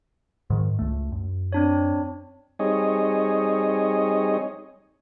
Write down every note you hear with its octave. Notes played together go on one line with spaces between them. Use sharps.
G#2 D#3
C#2 A3
F#2
C4 D4 C#5
G3 C4 D#4 G#4 C#5 D#5